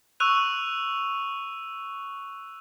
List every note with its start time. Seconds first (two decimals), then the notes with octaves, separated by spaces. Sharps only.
0.20 C#6 E6 F#6 D#7 F7